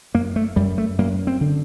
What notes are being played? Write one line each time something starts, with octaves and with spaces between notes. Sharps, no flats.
F#2 A#3
A3
F#2 G3
A3
F#2 A#3
C4
D3